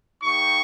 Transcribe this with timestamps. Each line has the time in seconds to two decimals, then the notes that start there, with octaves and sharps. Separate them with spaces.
0.23 A#3 D#4 G4 C#6